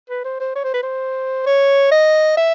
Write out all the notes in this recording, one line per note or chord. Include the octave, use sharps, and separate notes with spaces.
B4
C5
C5
C#5
C5
B4
C5
C#5
D#5
E5